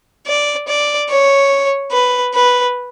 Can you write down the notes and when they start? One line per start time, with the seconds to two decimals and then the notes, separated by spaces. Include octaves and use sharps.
0.27 D5
0.67 D5
1.09 C#5
1.92 B4
2.34 B4